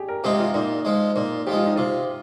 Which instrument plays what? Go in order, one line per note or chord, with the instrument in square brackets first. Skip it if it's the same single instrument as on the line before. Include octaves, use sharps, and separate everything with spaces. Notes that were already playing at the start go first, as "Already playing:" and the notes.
Already playing: [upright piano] G4 G#4
A#4
[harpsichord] C3 F3 G#3 D#4 [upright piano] G4
[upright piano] F4
[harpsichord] A#2 [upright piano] D#4
[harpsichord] F3 G#3
[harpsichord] A#2 [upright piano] D#4
[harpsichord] F3 G#3 [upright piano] G4
[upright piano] F4
D#4
[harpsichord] C3 [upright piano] F4